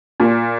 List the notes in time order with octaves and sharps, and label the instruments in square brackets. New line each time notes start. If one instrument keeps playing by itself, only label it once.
[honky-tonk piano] A#2